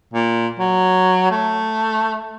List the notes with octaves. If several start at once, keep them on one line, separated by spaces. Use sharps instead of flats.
A#2
F#3
A3